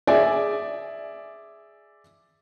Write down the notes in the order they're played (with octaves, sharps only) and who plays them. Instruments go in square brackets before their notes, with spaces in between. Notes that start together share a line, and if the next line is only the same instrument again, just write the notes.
[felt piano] G#4 D5 E5 G#5